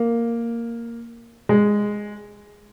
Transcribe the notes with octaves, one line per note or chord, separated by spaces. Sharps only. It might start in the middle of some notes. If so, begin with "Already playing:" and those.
Already playing: A#3
G#3